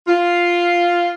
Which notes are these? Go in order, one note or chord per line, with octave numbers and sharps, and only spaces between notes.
F4